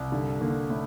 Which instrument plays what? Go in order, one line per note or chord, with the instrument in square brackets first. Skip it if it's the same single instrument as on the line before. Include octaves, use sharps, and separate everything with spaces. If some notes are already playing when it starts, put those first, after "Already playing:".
Already playing: [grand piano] C2
[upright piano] G2 G3 [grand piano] D3
[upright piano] A#2 A#3 [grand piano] D3
[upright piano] A2 A3